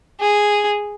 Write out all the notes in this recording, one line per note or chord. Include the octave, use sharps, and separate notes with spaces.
G#4